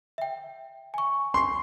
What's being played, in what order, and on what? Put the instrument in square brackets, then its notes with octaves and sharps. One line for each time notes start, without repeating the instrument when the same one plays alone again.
[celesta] E5 G5
G#5 C#6
[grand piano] C6 [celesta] C#6 C7